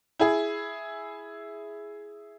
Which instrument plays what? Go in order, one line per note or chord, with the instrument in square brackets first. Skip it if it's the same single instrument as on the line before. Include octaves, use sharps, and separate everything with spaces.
[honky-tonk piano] E4 G#4